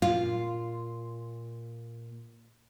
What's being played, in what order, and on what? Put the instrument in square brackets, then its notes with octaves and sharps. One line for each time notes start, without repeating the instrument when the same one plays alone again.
[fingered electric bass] A#2 [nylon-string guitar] F4 [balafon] F5